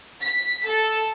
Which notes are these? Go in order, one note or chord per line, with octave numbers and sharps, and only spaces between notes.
B6
A4